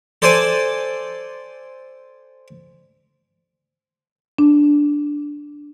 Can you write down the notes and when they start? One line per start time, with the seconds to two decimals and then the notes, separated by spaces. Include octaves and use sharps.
0.22 A4 C5 D5 G#5
4.38 D4